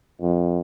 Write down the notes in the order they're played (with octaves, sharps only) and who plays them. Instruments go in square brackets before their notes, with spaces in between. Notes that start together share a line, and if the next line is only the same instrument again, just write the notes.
[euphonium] F2